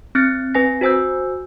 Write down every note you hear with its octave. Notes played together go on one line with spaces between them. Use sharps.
C4 F6 F#6 A6 C#7
C4 B4 G#5 A#6
F#4 C5 G#5 E6 G6